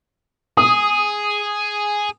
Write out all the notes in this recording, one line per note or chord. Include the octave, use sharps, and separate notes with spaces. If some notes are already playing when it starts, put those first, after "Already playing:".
G#4 D#6